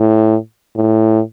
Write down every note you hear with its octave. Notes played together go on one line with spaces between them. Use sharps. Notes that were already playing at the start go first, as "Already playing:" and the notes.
Already playing: A2
A2